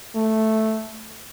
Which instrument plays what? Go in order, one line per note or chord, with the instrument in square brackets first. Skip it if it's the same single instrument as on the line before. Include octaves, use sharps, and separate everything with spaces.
[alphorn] A3